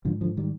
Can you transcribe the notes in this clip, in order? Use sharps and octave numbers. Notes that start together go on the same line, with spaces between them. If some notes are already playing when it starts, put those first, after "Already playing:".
G#2 D3 F3
D3 F3
D#3 G3